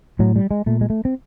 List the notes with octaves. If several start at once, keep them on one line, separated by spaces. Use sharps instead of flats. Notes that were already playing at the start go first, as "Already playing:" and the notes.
A2 F#3
G3
G#3
A#2 A3
G#3
A3
C4